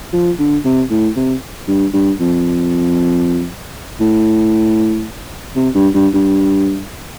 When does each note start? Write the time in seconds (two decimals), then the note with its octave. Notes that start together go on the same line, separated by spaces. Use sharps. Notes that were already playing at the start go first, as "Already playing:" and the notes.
0.13 F3
0.39 D3
0.65 C3
0.91 A2
1.16 C3
1.68 G2
1.94 G2
2.20 F2
4.00 A2
5.56 C3
5.75 G2
5.94 G2
6.14 G2